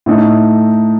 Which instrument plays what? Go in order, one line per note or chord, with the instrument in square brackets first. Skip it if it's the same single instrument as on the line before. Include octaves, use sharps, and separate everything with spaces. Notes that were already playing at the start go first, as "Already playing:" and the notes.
[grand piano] A2 A3 D#4